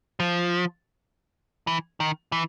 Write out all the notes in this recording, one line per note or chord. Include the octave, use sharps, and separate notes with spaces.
F3
E3
D#3
E3